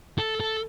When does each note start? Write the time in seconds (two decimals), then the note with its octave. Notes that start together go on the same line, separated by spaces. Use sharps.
0.18 A4
0.40 A4